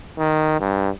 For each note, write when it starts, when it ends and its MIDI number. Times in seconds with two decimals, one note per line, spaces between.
0.19 0.56 51
0.60 0.89 43